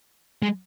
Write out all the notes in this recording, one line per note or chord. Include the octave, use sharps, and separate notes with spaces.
G#3